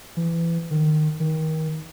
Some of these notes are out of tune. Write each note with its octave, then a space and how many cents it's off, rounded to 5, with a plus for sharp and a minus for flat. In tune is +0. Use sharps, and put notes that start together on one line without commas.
E3 +25
D#3 -20
D#3 +25